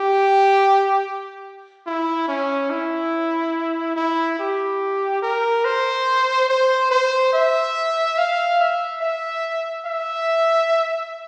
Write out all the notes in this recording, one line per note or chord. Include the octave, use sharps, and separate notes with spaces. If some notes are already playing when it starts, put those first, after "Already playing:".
Already playing: G4
E4
C#4
E4
E4
G4
A#4
C5
C5
C5
E5
F5
E5
E5
E5